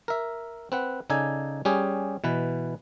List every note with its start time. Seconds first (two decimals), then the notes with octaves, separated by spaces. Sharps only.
0.08 A#4 E5
0.72 C4 B4 F#5
1.10 C#3 D#4 A4 D5 G#5
1.65 G3 C#4 G4 G#4
2.24 B2 E3 B4